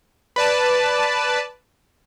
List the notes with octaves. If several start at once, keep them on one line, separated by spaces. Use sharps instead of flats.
B4 D5 A5